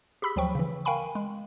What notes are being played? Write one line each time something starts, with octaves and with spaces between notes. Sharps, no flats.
G4 G#4 B5 E6 B6
D2 F3 F#3 G5 C#6
C#3 E3
A#4 F5 G5 G#5 B5 C#6
G#3